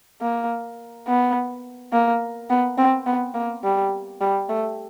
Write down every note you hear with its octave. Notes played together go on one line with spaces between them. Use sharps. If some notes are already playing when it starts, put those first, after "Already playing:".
A#3
B3
A#3
B3
C4
B3
A#3
G3
G3
A3